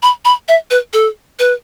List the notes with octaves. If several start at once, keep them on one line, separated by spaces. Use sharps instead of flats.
B5
B5
E5
B4
A4
B4